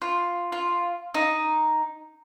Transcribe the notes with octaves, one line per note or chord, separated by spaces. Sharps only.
F4
F4
D#4